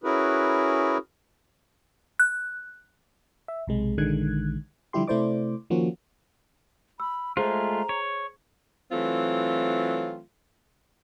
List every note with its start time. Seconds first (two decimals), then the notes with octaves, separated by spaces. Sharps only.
0.04 C#4 E4 F#4 G#4 A#4 B4
2.20 F#6
3.48 E5
3.67 B1 C3 G#3
3.98 A#1 D3 D#3 G#3 F#6 G#6
4.93 D3 F3 G3 E4 G4 C6
5.08 C3 A3 E4 C5 D5 D6
5.70 D#3 F3 A#3 C#4 F4 F#4
7.00 B5 E6
7.37 G#3 A3 F4 G#4 C5 A#5
7.89 C#5
8.92 E3 F#3 A3 C4 F4